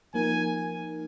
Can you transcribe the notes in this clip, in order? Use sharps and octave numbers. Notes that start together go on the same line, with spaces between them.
F3 A#3 D#4 A#4 G#5